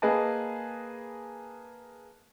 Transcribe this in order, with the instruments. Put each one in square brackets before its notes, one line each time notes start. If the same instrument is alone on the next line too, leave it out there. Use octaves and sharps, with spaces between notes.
[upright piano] A#3 G#4 B4 D#5 A5